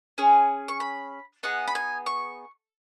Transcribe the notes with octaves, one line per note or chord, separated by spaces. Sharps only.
C#4 G#4
C#6
B5
B3 D#4 G#4 F#5
B5
G#5
C#6